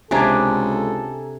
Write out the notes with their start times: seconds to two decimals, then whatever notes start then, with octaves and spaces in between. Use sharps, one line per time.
0.11 C#2 C3 D4 G#4 A4 G#5 A#5 G#6